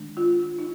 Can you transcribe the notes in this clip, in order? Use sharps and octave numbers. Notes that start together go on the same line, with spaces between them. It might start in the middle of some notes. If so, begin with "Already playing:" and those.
Already playing: D#3 G#3 D4
F4
D#4